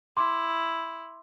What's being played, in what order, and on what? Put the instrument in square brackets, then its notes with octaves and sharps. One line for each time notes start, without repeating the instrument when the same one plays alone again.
[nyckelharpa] E4 [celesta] C6 D6